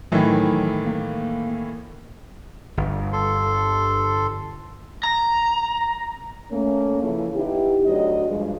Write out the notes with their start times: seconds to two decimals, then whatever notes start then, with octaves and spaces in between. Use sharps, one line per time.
0.12 A2 D#3 E3 F#3
0.86 A#3
2.77 G1
3.13 A4 C6
5.03 A#5
6.52 A3 A#3 C#4
7.02 C#3 E3 F3 C#4 E4 A4
7.34 B3 D#4 E4 G4
7.86 D2 F#3 D4 D#5
8.26 G2 F3 G#3